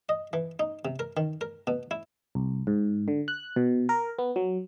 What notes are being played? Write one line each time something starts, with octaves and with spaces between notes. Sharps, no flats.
D#5
E3
D#4
C3
A#4
D#3
A#4
B2
E4
C2
G#2
D3
F#6
B2
A#4
B3
F#3